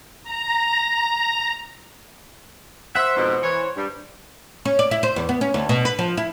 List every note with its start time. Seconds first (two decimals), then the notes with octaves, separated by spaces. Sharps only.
0.23 A#5
2.95 C5 E5 F#5
3.16 F2 G#2 B2
3.42 E3 C#5
3.76 G2 G3
4.65 C#4
4.79 D5
4.91 E4
5.03 C5
5.16 E2
5.29 B3
5.41 C#4
5.54 D2
5.69 B2
5.85 B4
5.99 F3
6.17 E4